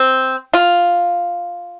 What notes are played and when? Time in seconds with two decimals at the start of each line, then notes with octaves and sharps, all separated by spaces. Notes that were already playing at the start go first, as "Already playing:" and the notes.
Already playing: C4
0.54 F4